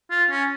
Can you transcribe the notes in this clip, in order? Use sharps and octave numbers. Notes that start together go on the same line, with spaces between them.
F4
C#4